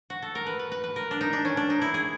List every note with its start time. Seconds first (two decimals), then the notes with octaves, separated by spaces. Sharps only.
0.10 F#4
0.22 A4
0.35 A#4
0.46 B4
0.59 B4
0.72 B4
0.84 B4
0.96 A#4
1.11 D4
1.21 D#4
1.33 D4
1.45 C#4
1.57 D4
1.70 D#4
1.82 E4
1.94 G#4